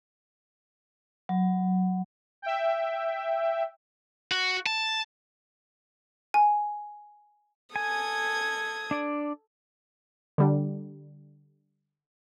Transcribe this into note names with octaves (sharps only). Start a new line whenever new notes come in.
F#3
E5 G5
F#4
A5
G#5
A4 G#5 D#6 G#6
D4 D5
D3 G3 D4